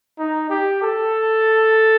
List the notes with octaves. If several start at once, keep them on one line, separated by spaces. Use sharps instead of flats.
D#4
G4
A4